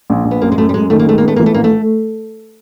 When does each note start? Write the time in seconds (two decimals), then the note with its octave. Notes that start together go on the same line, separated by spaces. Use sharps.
0.10 A#1
0.25 A#1
0.31 B3
0.42 F#2 A#3
0.52 G#3
0.58 F#2 A3
0.69 G3
0.74 F#2 G#3
0.90 D#3 A3
0.99 A#3
1.06 G#3 A3
1.18 A#3
1.23 B3
1.28 A3
1.36 E3 A#3
1.46 A3
1.54 A#1 A#3
1.64 A3